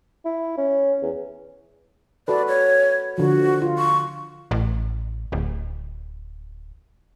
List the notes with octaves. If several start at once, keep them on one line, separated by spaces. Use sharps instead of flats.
E4
C#4
E2
F#4 A4 B4 D5
C#5
D3 F3 F#4
F4
C#6
A1
D1